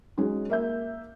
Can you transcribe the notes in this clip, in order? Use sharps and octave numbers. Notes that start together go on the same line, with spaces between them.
G#3 C#4 D#4 F#4
A#3 E5 G6